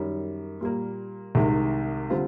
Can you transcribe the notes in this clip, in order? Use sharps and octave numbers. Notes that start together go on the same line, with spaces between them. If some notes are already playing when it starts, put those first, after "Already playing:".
Already playing: F#2 D#3 G3
A#2 G3 A#3
C2 C3 D#3 G#3
D3 G3 C4 F4